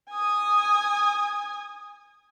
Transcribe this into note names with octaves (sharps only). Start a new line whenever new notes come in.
G#5 D#6